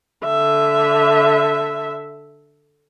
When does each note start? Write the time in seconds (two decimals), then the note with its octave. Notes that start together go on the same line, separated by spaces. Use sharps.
0.25 D3 E5